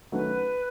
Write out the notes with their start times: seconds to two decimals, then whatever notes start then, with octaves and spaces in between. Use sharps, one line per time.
0.12 D#3 F#3 A3 C#4 F#4 B4